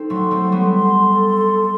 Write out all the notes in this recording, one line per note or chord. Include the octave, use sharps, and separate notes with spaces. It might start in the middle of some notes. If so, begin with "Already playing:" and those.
Already playing: C4 D#4 A4
F#3 A3 C6
A3 C4
A4
G3 B3
C6
A4
C6